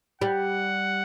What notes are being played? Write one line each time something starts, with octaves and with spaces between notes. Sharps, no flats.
G3 F#5